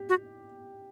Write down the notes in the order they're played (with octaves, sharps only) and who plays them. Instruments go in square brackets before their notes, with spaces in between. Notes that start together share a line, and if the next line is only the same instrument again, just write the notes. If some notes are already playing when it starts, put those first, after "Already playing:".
Already playing: [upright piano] G4
[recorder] F#4